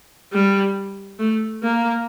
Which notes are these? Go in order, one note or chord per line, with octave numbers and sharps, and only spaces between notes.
G3
A3
A#3